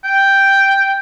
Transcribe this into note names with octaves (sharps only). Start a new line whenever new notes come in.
G5